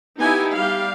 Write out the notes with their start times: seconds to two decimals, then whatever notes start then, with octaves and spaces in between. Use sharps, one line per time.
0.18 B3 D#4 E4 G4 G#5
0.55 G3 G4 F5